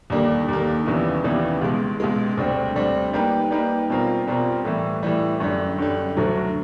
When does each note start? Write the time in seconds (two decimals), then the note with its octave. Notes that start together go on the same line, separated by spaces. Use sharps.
0.10 D#2 D3 G3 A#3
0.48 D#2 D3 G3 A#3
0.86 D#2 C#3 E3 G3 B3
1.24 D#2 C#3 E3 G3 B3
1.61 C#2 B2 G#3
2.00 C#2 B2 G#3
2.37 D2 D3 G3 C4
2.75 D2 D3 G3 C4
3.13 G3 A#3 D#4 G4 B4
3.51 G3 A#3 D#4 G4 B4
3.90 B2 G3 C4 F4 A#4
4.27 B2 G3 C4 F4 A#4
4.64 A2 E3 G3
5.03 A2 E3 G3
5.40 F#2 D3 G3
5.78 F#2 D3 G3
6.16 D2 D3 F#3 A3